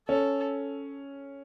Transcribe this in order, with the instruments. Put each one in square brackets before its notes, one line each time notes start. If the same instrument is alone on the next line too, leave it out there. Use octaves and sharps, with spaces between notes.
[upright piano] C#4 [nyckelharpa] A4